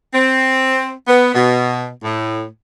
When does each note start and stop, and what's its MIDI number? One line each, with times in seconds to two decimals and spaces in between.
0.13 0.90 60
1.07 1.33 59
1.35 1.88 47
2.03 2.44 45